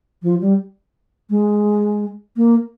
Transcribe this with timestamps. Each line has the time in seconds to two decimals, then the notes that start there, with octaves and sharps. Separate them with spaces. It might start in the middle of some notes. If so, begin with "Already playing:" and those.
0.22 F3
0.41 G3
1.30 G#3
2.36 A#3